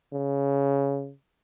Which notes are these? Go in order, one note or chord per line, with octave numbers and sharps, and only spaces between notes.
C#3